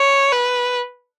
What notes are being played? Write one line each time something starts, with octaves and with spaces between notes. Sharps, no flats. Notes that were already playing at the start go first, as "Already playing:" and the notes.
Already playing: C#5
B4